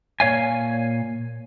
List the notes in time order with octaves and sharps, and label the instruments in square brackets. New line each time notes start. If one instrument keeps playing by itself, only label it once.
[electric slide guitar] A#2 C#5 F5 G#5